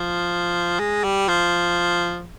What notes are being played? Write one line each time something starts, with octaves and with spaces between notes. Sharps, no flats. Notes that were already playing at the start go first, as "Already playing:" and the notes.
Already playing: F3
G#3
G3
F3